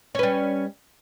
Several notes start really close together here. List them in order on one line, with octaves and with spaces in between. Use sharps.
C#4 B4 G3